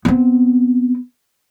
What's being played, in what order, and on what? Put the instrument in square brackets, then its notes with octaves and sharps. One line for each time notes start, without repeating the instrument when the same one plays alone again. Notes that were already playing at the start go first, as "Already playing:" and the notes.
[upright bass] B3 C4